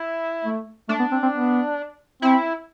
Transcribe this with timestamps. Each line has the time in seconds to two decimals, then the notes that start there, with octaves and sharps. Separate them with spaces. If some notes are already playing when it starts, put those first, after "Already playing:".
Already playing: E4
0.45 A3
0.89 A3 D4
1.00 B3
1.12 C4
1.22 C4
1.34 B3
2.22 C4 E4